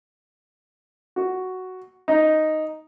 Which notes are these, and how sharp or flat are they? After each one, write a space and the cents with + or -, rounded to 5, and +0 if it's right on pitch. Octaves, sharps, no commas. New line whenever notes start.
F#4 +5
D#4 +0